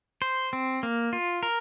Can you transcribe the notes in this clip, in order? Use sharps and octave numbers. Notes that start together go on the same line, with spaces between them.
C5
C4
A#3
F4
A#4